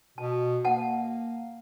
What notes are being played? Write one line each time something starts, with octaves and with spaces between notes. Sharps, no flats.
B2 A5
A#3 F#5 A5